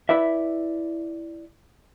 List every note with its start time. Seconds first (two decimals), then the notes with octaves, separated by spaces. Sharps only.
0.09 E4 B4 D5 E5